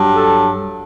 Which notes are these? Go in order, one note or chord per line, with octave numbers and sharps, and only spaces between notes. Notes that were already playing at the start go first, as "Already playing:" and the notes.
Already playing: G2 F#3
A4